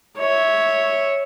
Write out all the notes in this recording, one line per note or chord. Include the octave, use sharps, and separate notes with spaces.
C#5 E5